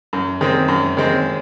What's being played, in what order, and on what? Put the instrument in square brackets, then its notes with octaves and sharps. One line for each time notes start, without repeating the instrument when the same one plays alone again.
[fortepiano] F#2
D#3 G#3 C4
F#2
D#3 G#3 C4